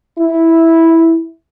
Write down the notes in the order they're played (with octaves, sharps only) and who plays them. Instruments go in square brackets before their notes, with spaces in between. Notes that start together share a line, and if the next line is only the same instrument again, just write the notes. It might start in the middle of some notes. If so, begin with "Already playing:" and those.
[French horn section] E4